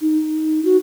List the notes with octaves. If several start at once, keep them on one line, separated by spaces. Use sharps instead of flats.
D#4
F#4